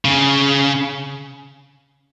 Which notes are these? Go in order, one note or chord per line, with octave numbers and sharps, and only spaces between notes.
C#3